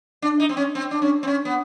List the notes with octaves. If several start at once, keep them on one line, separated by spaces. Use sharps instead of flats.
D4
D#4
C4
C#4
C4
D4
C#4
C4
C#4
B3